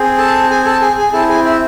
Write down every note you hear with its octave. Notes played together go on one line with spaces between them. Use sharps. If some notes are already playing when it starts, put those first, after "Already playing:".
Already playing: C4 G#4
A4 A5
G#4 G#5
A4 A5
G#4 G#5
G#4 G#5
C4 E4 G#4 A4 A5
G#4 G#5
E4 E5